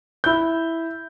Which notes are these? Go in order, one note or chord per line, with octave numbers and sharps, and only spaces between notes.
E4 G6